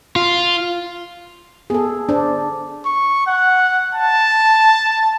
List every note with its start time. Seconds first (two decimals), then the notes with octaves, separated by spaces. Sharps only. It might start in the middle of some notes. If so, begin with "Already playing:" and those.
0.16 F4
1.70 B3 G#4 A4
2.09 D4 C5
2.86 C#6
3.27 F#5
3.95 A5